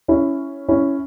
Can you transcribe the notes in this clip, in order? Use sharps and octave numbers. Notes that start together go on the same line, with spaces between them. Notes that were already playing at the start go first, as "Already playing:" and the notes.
C#4 E4
C#4 E4